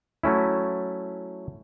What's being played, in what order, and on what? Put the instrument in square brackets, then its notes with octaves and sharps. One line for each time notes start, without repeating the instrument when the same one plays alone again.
[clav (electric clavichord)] F#3 A3 C#4 E4